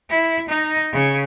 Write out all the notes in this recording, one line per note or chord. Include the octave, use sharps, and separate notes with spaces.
E4
D#4
C#3